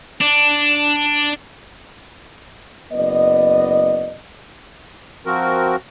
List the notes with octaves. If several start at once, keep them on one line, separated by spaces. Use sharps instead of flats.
D4
F#1 B3 D5 D#5
F3 C4 F#4 A#4